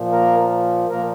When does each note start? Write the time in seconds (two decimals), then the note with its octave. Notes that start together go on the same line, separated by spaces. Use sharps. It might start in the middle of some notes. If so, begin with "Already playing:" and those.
Already playing: A#2 F3
0.12 A#3 A#4
0.89 A#2 F3 A#3 A#4